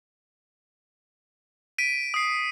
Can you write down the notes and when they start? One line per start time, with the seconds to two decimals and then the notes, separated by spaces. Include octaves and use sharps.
1.78 B6 D7 D#7
2.14 D#6 C7